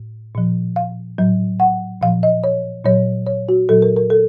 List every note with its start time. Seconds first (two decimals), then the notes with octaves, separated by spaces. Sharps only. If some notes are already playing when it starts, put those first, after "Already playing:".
Already playing: A2
0.35 A#2 F3
0.76 F5
1.18 A2 F#3
1.60 F#5
2.01 A#2 F3 F5
2.23 D#5
2.44 C#5
2.85 A#2 F#3 C#5
3.27 C#5
3.49 F#4
3.69 A#2 F#3 A4
3.82 A#4
3.97 A#4
4.10 A4